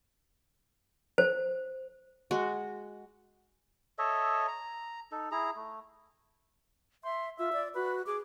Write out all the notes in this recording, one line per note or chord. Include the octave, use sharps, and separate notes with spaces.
C5
G#3 F#4
A4 C#5 D#5 E5
A#5
D#4 A4
E4 G#4 A#5
A3
E5 C6
F4 E5
D5
F#4 B4
G#4 D6